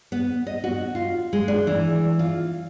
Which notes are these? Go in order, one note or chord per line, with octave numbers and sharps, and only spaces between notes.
B3
D#5
F#4
F4
G#3
D4
E3
F4